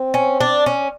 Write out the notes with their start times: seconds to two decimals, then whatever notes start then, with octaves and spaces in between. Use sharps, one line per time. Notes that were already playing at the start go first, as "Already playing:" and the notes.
Already playing: C4
0.14 C#4
0.40 D4
0.66 C#4